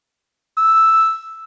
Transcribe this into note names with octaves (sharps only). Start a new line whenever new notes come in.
E6